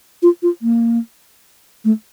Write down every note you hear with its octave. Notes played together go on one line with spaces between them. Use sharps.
F4
F4
A#3
A3